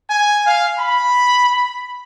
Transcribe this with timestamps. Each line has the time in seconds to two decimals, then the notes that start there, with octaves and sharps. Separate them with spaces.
0.10 G#5
0.47 F5
0.79 B5